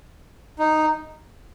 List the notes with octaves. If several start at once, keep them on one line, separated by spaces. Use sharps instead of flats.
D#4